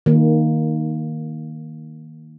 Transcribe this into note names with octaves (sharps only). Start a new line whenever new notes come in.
D#3 A#3